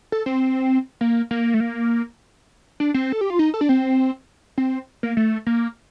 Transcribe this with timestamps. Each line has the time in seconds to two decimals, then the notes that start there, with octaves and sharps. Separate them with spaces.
0.12 A4
0.26 C4
1.01 A#3
1.31 A#3
1.54 A3
1.60 A#3
2.80 D4
2.94 C4
3.12 A4
3.21 G4
3.30 F4
3.39 D#4
3.54 A4
3.61 D4
3.69 C4
4.58 C4
5.03 A#3
5.17 A3
5.47 A#3